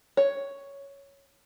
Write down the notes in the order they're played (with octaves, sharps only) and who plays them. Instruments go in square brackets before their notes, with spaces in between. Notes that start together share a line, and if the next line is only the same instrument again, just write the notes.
[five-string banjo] C#5